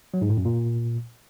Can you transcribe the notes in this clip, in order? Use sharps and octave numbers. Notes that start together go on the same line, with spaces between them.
F#3
G#2
A2
F#2
A#2